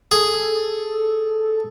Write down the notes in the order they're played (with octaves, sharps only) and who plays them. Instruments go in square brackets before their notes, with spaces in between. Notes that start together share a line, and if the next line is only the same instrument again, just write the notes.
[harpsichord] G#4 [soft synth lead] A4